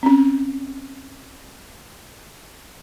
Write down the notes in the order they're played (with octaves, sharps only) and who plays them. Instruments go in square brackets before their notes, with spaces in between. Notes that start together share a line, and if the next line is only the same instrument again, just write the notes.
[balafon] C4 C#4